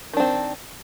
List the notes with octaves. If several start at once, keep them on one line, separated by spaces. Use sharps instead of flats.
D#3 C4 D4